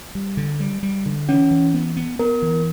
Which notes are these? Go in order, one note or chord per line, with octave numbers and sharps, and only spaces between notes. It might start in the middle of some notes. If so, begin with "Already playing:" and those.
G3
D3
G3
G3
D3
E3 C#4
E3
B3
B3
B3 A#4
E3